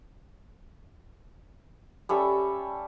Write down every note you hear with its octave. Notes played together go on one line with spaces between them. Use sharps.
G3 C#4 A4 E5